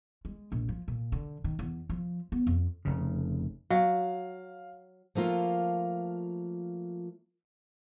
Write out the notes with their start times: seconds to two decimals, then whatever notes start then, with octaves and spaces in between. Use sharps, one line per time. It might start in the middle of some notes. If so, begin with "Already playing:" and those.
0.25 G#3
0.52 A#1
0.69 F3
0.88 A#2
1.12 D3
1.44 D#3
1.59 E2
1.90 F3
2.32 B3
2.47 F2
2.85 F1 C#3
3.70 F#3 F5
5.15 F3 A3 A#3 F4